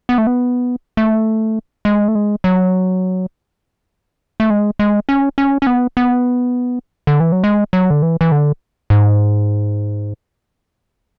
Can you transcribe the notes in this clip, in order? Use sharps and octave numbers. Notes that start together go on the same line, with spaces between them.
B3
A3
B3
A3
G#3
A3
G#3
F#3
A3
G#3
G#3
C#4
C#4
C#4
B3
B3
D3
E3
F#3
G#3
F#3
D3
E3
E3
D3
G#2